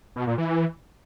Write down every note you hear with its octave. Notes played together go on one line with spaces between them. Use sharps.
B2
A#2
E3